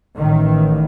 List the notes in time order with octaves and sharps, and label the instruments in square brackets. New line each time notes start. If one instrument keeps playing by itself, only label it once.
[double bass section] A1 A2 D#3